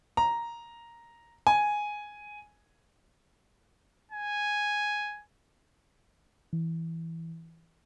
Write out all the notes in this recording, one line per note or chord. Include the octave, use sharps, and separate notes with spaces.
A#5
G#5
G#5
E3